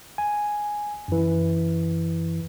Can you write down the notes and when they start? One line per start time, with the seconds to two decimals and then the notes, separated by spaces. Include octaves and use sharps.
0.18 G#5
1.08 F#2 E3